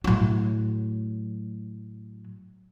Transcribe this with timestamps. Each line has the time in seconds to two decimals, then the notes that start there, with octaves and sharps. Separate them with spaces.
0.04 A2 F#3